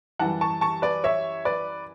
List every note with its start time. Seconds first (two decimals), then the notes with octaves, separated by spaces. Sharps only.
0.19 F#2 E3 G3 F#5 A5
0.41 A5 C#6
0.61 A5 C#6
0.82 B4 D5
1.04 C#5 E5
1.45 B4 D5